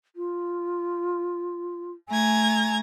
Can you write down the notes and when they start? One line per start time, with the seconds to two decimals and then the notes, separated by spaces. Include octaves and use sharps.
0.16 F4
2.08 A3 G#5 A#5 G#6